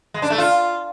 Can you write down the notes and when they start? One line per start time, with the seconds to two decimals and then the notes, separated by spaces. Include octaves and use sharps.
0.14 G#3
0.22 D4
0.30 A3
0.38 F4